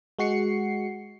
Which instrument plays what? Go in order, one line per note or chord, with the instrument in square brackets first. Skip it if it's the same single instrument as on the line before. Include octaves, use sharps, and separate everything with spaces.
[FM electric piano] G#3 F#4 C7 C#7